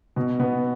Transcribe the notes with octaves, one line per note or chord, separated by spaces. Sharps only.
B2
B2 B3